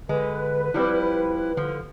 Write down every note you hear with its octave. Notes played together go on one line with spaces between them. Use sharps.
D3 G#3 B4
F3 G3 C4 E4
D3 F3